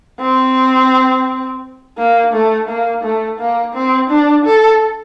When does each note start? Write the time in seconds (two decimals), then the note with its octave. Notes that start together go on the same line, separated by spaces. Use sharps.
0.21 C4
1.98 A#3
2.33 A3
2.69 A#3
3.03 A3
3.39 A#3
3.74 C4
4.10 D4
4.46 A4